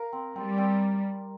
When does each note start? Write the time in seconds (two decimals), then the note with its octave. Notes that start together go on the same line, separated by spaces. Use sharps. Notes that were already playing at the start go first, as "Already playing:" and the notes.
Already playing: A#4 F5
0.13 C4
0.36 G3 C4
0.58 C4